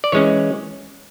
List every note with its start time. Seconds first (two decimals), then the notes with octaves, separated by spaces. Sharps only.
0.04 D5
0.12 E3 G#3 C#4 C#5